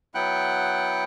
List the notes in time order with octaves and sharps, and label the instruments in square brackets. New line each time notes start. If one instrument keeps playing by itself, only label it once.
[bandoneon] F#3 B3 E4 F#5 G5 F#6